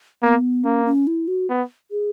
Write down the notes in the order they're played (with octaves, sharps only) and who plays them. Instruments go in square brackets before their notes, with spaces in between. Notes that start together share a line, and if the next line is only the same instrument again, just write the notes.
[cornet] A#3 [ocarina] B3
[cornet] A#3 [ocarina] C#4
[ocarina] C#4
E4
F#4
[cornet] B3
[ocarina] G#4